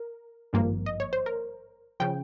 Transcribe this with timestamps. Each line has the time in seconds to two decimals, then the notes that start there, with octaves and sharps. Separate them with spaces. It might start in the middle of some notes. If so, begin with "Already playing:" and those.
Already playing: A#4
0.53 G#1 G2 F3 A#3
0.86 D#5
1.00 C#5
1.13 C5
1.26 A#4
2.00 C#3 F3 G5